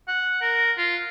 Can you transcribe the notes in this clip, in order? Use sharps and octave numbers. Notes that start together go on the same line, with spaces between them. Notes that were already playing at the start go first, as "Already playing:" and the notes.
F#5
A#4
F4